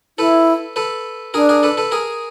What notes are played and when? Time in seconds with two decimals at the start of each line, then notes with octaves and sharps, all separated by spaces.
0.18 E4 A4 B4
0.76 A4 B4
1.34 D4 G#4 A#4
1.49 G#4 A#4
1.63 A4 B4
1.77 A4 B4
1.92 G#4 A#4